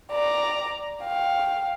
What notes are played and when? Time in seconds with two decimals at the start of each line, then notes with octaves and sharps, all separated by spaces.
0.12 D5 A#5
1.04 F5 G5